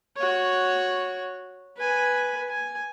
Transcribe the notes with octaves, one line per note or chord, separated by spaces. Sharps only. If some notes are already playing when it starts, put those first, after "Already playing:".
F#4 C#5
B4 G#5
G#5